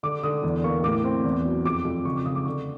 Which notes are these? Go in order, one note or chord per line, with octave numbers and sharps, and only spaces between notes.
D3 D6
D3 D#6
E2
A#3 C#6
A2 D6
C4
E2
F#3
F2 D6
F2
C#3 C#6
D6
C#3 D#6
D6
D3 C#6